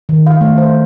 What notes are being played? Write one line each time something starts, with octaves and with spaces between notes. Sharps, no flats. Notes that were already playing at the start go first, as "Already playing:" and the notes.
D#3
F5
A3
C5